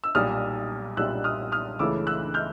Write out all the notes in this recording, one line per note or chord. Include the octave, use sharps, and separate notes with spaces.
E6
B1 A#2 G3 D#6 F6
B1 A#2 G3 E6 F#6
D#6 F6
D#6 F6
C#2 C#3 E3 A3 D6 E6
E6 F#6
F6 G6